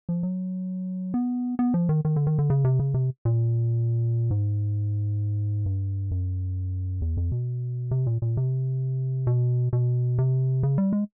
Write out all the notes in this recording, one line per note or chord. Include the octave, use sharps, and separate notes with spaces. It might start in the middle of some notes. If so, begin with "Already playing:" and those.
F3
F#3
B3
B3
F3
D#3
D#3
D3
D#3
D3
C#3
C3
C#3
C3
A#2
G#2
G2
F#2
E2
F2
B2
C3
A#2
A#2
C3
B2
B2
C3
C#3
G3
G#3